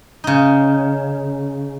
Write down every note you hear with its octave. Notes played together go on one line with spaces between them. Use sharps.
C#3 D#4